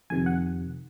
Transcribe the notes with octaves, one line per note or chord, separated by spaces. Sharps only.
F2 C3 D#3 G#5
F#5